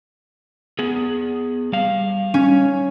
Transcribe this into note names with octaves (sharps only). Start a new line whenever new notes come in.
B3 G#4
G3 F5
C#4